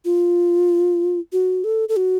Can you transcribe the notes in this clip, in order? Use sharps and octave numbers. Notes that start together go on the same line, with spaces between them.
F4
F#4
A4
A4
F#4